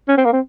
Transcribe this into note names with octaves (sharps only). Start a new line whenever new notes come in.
C#4
C4
A#3
C4